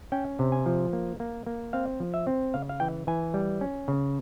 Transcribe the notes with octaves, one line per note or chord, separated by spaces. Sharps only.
C#4 G5
C3
G#5
F3
A#3
A#3
A#3
C4 F5
F3
E5
C4
C#3 F5
F5
E3 G5
E3 G#5
G3
C#4
C#3